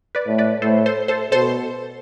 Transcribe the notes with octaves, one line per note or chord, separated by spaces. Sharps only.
B4 D5
A2
B4 D5
A2 A4 C5
A4 C5
A4 C5
B2 A4 C5